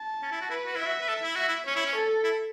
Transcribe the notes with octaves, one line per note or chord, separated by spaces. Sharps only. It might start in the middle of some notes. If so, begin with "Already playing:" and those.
Already playing: A5
C#4
E4
F#4
E4 B4
F#4
E4 E5
F#4
B4
A4
E4
F#4 E5
E4
C#4 C#5
E4
C#4
A4
E4